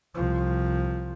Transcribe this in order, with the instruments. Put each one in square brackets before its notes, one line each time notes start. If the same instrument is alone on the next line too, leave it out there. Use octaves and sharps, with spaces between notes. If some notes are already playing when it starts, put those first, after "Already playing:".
[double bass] C2 F3